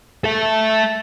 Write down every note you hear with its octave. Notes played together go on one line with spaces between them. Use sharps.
A4 E5